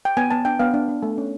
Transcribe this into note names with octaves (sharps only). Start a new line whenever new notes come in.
G5
B3 G#5
B3 A5
D4 G5
B3 F5
D4
B3
A3
C#4